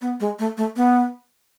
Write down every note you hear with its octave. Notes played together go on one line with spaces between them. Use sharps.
B3
G#3
A3
A3
B3